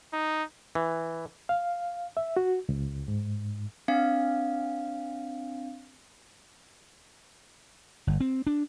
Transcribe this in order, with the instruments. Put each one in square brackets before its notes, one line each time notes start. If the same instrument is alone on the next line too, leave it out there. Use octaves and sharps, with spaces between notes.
[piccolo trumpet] D#4
[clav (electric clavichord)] E3
[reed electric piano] F5
E5
F#4
C#2
G#2
[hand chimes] C4 D4 F5
[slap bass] G1
C4
D4